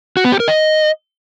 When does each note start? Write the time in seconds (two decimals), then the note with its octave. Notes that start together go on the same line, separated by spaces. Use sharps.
0.17 F#4
0.24 B3
0.32 G4
0.40 A#4
0.48 D#5